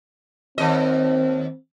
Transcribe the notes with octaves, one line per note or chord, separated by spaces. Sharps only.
D#2 C4 D#5